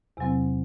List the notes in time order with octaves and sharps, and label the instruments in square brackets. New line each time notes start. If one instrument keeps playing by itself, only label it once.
[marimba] E2 C3 F#3 C4